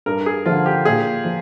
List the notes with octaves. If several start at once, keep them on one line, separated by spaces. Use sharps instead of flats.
G2 A#4
G#4
D3 F3 F4
G4
A#2 G#4
F3